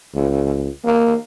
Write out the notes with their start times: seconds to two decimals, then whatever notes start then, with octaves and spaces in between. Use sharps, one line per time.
0.14 C#2
0.85 A#3